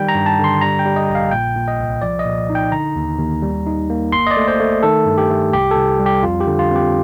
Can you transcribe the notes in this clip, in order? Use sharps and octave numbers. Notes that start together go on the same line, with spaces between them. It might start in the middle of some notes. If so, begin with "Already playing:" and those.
Already playing: D#3 G3 G5
A#5
G2
A5
D3
C6
G3 A#5
G5
G3
D#5
A#1
F5
A#2 G5
A#2
D#5
C2
F3 D5
D#5
A#2
D#4
G5
D3 A#5
D#2
D#2
G3
D#4
A#3
G1 C6
D#5
D5
A3
C5
A3
D#3 A4
G2
G4
A3
C2 G4
A4
C2
G3
G4
F2 F4
G4
D3
F4
C4 G4